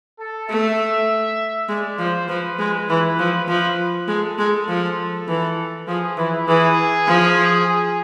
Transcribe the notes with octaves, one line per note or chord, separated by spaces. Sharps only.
A4
A3 E5
G#3 D5
F3 C5
F3 B4
G#3
E3
F3
F3
G#3 A4
G#3
F3
E3
F3 G#4
E3 E4
E3 G#4
F3
G#4